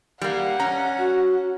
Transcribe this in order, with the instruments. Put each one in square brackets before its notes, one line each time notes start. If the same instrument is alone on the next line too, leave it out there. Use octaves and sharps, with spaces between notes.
[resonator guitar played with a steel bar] G3 A#3 [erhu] F#5
[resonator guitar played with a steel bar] C#4 [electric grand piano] A#5
[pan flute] F#4